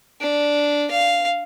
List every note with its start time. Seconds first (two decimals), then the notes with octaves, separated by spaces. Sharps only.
0.21 D4
0.91 F5